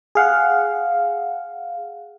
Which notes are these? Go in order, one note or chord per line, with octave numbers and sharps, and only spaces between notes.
G#4 F5 F#5